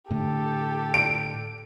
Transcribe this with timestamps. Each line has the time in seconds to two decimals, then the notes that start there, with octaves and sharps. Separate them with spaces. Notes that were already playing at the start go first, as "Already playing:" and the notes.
0.11 A2 D3 G4 A4
0.94 D7